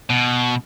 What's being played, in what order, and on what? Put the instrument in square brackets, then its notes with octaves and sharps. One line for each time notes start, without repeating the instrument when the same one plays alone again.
[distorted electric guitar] B2